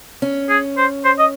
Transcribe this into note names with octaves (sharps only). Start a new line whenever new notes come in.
C#4
G#4
C5
C5
D#5